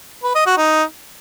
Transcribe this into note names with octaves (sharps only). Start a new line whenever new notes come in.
B4
D#5
F#4
D#4